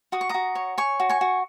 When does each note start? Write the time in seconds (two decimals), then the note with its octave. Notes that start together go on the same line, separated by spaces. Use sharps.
0.12 F#4 D#6
0.21 C#6
0.29 F#4 A#5 D#6
0.55 C#5
0.78 C#5 G#5 C#6
1.00 F#4
1.09 G#5 C#6
1.21 F#4